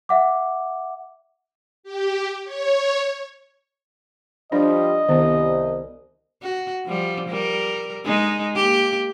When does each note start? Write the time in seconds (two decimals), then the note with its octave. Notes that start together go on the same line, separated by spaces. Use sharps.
0.09 E5 F#5 D6
1.83 G4
2.45 C#5
4.52 F3 G3 D4 D#5
5.08 C2 D#3 B3
6.42 F#4
6.87 F3 G3
7.29 G3 A#4
8.05 G#3 D#4
8.55 A#3 G4